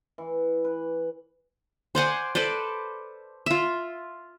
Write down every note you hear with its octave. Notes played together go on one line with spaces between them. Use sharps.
E3
B4
C5 D5 F#5 G#5
A4 B4 C5 D5
F4 E5